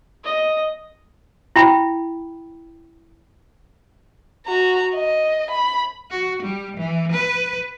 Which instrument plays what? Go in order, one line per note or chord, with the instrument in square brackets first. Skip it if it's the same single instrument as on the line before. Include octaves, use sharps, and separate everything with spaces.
[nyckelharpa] D#5
[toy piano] E4 G5 B5
[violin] F#4 A#5
D#5
B5
[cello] F#4
G3
E3
B4